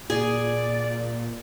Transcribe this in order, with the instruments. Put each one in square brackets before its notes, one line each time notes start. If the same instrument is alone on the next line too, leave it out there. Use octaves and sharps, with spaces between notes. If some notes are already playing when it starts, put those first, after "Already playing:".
[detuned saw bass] A#2 [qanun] G#4 [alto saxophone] D5